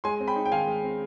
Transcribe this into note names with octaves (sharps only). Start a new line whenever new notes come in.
G#3 G#5 C6
C4
G5 B5
D#4
G5
D#3 F5 G#5
G#3
C4